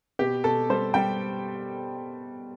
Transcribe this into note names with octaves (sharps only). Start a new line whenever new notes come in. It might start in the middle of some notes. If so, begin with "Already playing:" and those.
B2 G4
B2 A4
G3 C5
G3 G5